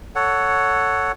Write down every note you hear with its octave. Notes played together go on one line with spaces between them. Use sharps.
A4 C#5 F#5